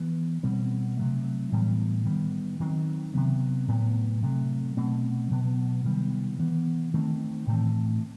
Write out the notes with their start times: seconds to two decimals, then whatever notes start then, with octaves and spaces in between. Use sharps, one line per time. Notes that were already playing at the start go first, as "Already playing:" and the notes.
Already playing: E3 B3
0.43 B2 G3 C4
0.97 C3 F#3 A3
1.52 A2 E3 G3 B3
2.05 D#3 G3 B3
2.60 D#3 F#3 C4
3.14 C3 F#3 B3
3.68 A2 F#3 B3
4.22 C3 F#3 A3
4.77 B2 A3 C4
5.31 B2 F#3 B3
5.85 C3 D#3 G3 B3
6.38 E3 B3
6.94 D#3 A3 C4
7.47 A2 E3 A3 C4